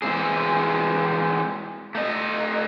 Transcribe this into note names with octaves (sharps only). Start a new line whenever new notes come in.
E3 G#3 C4 G#4
A3 D#5